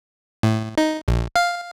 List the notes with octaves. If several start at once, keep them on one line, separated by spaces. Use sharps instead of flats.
A2
D#4
A#1
F5